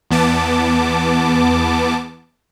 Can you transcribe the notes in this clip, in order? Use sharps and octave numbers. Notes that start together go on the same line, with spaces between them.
E2 B3 A5 D6